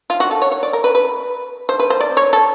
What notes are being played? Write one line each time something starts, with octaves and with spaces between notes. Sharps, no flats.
F4
F#4
A4
C#5
C#5
D5
A#4
B4
B4
C5
B4
C5
D5
C#5
A4